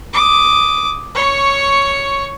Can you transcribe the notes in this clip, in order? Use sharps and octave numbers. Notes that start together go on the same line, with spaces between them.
D6 D#6
C#5 C#6